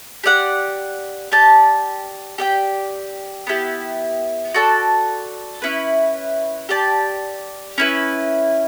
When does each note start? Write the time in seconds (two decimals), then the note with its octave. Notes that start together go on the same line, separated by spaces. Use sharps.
0.24 G4 D5 F#5
1.32 G4 D5 A5
2.38 G4 D5 G5
3.47 B3 E4 G4
4.54 F#4 A4 D5 A5
5.62 C#4 E4 B4
6.69 G4 D5 A5
7.78 C#4 E4 B4